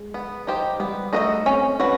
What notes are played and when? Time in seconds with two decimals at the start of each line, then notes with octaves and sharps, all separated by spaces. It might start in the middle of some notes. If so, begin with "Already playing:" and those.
Already playing: G#3
0.14 B3
0.47 D#4 G4 C5
0.80 G3 B3
1.13 A3 D#4 F#4 B4 D#5
1.46 C4 C#4
1.79 C#4 F#4 B4